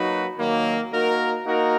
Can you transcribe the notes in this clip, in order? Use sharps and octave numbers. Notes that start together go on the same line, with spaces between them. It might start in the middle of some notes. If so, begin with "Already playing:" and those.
Already playing: F#3 A#3 D#4 F#4 B4
D#3 F#3 A#3
A#3 D#4 F#4 A#4
A#3 D#4 F#4 A#4